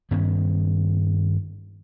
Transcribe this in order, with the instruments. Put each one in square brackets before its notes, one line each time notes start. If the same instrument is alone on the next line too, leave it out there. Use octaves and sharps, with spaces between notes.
[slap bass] G2 D#3 B3 C#4